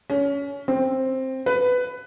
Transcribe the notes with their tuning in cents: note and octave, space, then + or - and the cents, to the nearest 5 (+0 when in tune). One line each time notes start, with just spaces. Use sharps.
C#4 +25
C4 +10
B4 +15